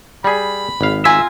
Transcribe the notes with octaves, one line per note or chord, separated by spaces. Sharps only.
G3 G#4 B5
G#1 F5
F4 E5 G#5 A#5